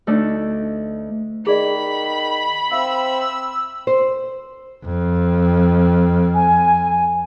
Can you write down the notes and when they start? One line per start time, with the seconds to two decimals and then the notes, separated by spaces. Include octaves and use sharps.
0.07 D2 A3 D4 D#4
1.47 D#3 G#4 D5 D#5 B5
2.72 C4 E5 F5 E6
3.87 C5
4.85 F2
6.34 G#5